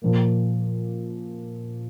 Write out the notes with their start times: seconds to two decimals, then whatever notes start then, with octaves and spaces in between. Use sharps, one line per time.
0.02 A#2 F3 A#3